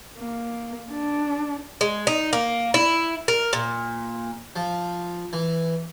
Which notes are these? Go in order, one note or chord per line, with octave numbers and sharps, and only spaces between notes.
A#3
D4
G#3
D#4
A#3
E4
A#4
A#2
F3
E3